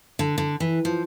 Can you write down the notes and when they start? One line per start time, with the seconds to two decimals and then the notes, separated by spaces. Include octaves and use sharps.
0.19 D3
0.38 D3
0.60 E3
0.85 F3